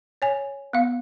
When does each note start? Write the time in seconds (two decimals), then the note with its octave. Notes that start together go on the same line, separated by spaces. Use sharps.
0.22 C#5 G#5
0.73 B3 F5